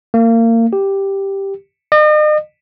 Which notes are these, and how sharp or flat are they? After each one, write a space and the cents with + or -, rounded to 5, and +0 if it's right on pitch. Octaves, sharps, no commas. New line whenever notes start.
A#3 -30
G4 +0
D#5 -40